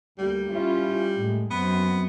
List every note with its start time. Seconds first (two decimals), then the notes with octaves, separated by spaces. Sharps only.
0.18 D2 G3 A#3
0.50 C#4 E4 F4
1.16 A2 G#3
1.51 F#2 B3 C4